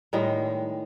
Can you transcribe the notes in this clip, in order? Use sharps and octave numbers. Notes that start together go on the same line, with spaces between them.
A2 D#3 G3 G#3